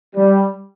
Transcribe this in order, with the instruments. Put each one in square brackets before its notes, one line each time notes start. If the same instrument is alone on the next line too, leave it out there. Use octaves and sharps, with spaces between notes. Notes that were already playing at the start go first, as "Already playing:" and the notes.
[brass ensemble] G3